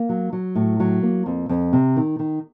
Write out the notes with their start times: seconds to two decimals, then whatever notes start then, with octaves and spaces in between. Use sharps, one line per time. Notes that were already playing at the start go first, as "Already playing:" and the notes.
Already playing: A#3
0.09 F#3
0.33 F#3
0.55 A2
0.80 F#3
1.02 A#3
1.26 F2
1.49 F2
1.73 C3
1.96 D#3
2.19 D#3